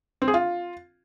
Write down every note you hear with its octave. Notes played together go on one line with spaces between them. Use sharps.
C4
G#4
F4